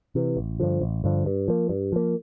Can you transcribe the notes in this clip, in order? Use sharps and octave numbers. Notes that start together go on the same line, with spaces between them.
C3 E3
A1
G2 D3 F3
A1
G2 D3 F3
G2
F3 A#3
G2
F3 A#3